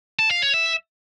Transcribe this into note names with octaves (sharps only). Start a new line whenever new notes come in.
A5
F5
C#5
E5